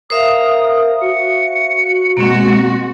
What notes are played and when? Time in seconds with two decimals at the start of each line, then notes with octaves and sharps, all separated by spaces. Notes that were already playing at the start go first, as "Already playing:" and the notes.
0.10 A#4 C5 E5 F5 D#6
1.02 F#4 C#7
2.17 B2 G#3 A#3 C4 F#4